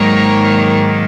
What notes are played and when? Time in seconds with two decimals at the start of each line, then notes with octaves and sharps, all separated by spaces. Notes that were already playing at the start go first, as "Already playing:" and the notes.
Already playing: G#2 D#3 F#3 A#3 A#4 C#5